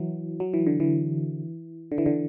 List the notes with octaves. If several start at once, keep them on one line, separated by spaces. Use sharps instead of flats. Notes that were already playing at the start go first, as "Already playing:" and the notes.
Already playing: E3 F#3
F#3
E3
D3
E3
D3
E3
D3